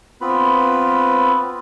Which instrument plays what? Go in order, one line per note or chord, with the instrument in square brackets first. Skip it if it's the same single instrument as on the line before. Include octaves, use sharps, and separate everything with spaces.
[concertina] B3 C4 F4 B4 B5